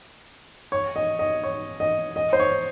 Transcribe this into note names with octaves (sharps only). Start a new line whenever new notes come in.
C#5
D#5
D#5
C#5
D#5
D#5
C5
C#5